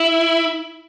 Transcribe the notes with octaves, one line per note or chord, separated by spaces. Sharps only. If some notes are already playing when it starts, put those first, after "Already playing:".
Already playing: E4